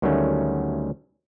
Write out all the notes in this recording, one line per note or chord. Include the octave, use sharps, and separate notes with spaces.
D2 D#3 F#3 G3 A3 C#4